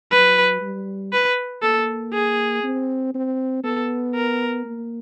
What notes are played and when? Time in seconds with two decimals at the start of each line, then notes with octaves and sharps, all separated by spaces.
0.11 F#3 B4
0.61 G3
1.13 B4
1.62 A#3 A4
2.13 G#4
2.63 C4
3.14 C4
3.64 B3 A4
4.15 A#4
4.65 A#3